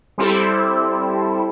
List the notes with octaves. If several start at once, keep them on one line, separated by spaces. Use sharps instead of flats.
G3 C4 E4 A4